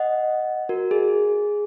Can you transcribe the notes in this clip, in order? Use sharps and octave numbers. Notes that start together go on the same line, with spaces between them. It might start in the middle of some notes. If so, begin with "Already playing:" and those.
Already playing: D#5 F#5
F#4 A#4
G#4